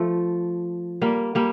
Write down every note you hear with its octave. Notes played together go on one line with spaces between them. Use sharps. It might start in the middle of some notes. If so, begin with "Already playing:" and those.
Already playing: F3 A3
G3 A#3
G3 A#3